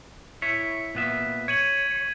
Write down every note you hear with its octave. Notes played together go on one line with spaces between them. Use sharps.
E4 C#5 B6
A#2 B3 E5
C#5 G#6 D#7 F#7